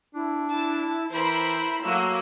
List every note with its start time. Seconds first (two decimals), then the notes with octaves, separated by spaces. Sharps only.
0.15 D4 E4
0.51 E4 A5
1.12 E3 E4 A#4 C5 B5
1.84 F#3 A3 A#3 E6